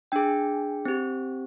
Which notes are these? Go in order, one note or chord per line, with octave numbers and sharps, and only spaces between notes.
D4 G#4 G5
C4 G4